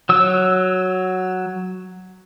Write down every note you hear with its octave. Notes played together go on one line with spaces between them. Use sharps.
F#3 E6